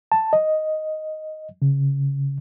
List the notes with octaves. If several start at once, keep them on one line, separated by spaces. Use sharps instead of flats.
A5
D#5
C#3